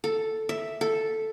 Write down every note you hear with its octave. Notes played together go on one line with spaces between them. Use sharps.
A4
E5
A4